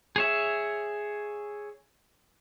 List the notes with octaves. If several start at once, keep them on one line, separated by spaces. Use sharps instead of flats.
G#4 C#5 E5